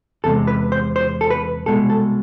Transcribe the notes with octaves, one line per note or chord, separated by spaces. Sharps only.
E2 C3 G#3 A4
B4
C5
C5
A4
B4
C2 B2 G#3 A4
A4